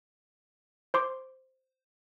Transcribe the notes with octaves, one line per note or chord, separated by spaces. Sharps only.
C5 C6 D6